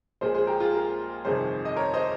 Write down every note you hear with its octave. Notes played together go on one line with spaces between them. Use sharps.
A#1 A#2 F3 G#3 G#4 C5
G#4 C5
G4 A#4
F4 G#4
G4 A#4
G1 F2 C3 D#3 G#4 C5
D#5
A#4 C#5
C5 D#5